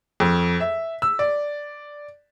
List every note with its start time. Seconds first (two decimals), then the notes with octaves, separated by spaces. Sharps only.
0.20 F2
0.60 E5
1.02 E6
1.19 D5